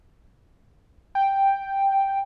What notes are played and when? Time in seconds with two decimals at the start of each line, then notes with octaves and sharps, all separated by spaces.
1.15 G5